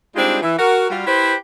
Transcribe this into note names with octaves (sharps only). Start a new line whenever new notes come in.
G3 G#3 C4 D4 D#4 F4
E3
F#4 A#4
G3 F4 F#4
E4 G4 B4 C5